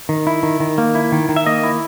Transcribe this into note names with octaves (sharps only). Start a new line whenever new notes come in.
D#3
E4
D#3
D#3
A#3
E4
D#3
D#3
E5
A#3 D#5
E4